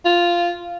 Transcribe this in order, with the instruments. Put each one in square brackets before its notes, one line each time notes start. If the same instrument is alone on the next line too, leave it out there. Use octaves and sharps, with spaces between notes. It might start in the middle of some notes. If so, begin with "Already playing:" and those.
[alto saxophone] F4